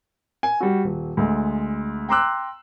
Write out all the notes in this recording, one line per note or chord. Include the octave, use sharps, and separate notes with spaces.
G#5
G3 F#4
D#1
D2 G#3
G5 A#5 C6 D6 E6 F#6